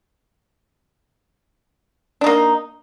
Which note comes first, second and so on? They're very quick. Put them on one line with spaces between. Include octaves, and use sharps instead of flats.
D4 D#4 A#3